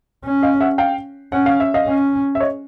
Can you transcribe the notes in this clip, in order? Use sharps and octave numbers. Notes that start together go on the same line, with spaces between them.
C#4
D#5 F5
E5 F#5
F5 G5
C#4 F#5
F5
E5
D#5 F5
C#4
E5
C#5 D#5